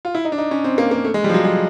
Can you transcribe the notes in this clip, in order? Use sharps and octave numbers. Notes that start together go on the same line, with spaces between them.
F4
E4
D#4
D4
D#4
C#4
C4
A#3
A#3
A3
G#3
G3
F3
F#3
G#3